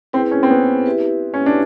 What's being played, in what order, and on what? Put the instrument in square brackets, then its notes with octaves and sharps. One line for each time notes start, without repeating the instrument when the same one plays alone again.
[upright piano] C4 [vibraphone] E4 G#4 B4
[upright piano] C#4
C4
B3
[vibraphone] E4 G4 B4 E5
[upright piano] C#4
D4